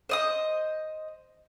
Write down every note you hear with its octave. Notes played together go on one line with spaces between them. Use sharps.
C5 D#5 D#6